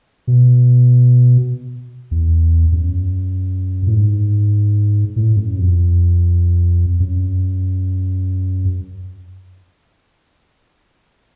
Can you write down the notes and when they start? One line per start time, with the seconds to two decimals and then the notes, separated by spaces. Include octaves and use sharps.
0.27 B2
2.11 E2
2.72 F#2
3.87 A2
3.95 G#2
5.16 A2
5.36 F#2
5.57 F2
7.00 F#2